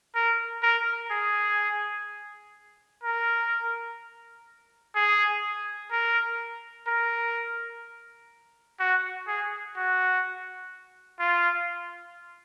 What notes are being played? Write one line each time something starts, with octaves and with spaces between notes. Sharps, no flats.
A#4
A#4
G#4
A#4
G#4
A#4
A#4
F#4
G#4
F#4
F4